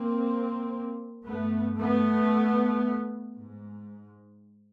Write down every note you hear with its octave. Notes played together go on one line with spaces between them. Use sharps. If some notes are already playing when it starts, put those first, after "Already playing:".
Already playing: A#3 C4
G2 A3 B3
A3 B3
G#2